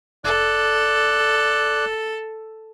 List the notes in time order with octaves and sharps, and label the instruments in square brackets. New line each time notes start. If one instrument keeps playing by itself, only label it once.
[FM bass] F1 [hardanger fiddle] A4 [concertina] D5 F#6